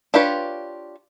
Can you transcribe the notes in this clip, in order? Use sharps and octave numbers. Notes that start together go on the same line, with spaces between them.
D4 F4 G4 B4 C#5